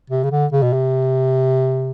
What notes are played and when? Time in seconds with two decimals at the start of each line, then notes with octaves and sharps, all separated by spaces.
0.10 C3
0.23 C#3
0.31 D3
0.52 C#3
0.63 B2
0.73 C3